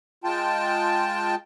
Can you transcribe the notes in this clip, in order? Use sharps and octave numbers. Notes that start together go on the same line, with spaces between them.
G#3 F4 G5 A5